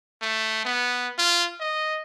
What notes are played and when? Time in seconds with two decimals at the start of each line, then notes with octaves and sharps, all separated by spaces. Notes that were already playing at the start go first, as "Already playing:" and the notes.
0.22 A3
0.65 B3
1.18 F4
1.60 D#5